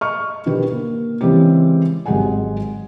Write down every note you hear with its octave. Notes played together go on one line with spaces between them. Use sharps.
D#5 C#6 F6
B2 D3 D#3 G4 B4
A#3
C#3 E3 G#3 C4 G4
G#1 F#3 G#3 G4 F#5 G#5